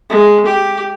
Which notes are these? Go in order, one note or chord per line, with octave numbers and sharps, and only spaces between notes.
G#3
G4